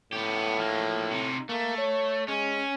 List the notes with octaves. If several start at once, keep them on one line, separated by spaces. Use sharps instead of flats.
A2 B3 G4
F3 A#3
C3 D#4
A3 A#3
C#5
G#3 C#4